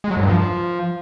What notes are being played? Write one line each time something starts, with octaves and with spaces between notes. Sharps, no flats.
G#3
F#3
F#2
G2
F3